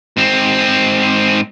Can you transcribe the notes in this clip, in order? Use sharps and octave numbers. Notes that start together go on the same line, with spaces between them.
G#2 C4